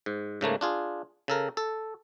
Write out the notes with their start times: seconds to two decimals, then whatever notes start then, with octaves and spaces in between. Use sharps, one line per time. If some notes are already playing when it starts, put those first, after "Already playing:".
0.06 G#2
0.41 G#2 C#3 A3 A#3
0.61 D4 F4 G#4
1.28 C#3 A4 A#4
1.57 A4